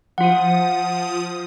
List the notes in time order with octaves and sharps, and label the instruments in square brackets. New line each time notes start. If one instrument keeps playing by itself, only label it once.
[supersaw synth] F3 D#6 [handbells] F4 F#5